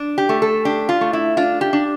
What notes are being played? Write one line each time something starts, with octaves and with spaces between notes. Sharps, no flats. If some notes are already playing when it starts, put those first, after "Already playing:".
Already playing: D4
G4
A3
A4
D4 G4
F4
A3
E4
D4 F4
G4
D4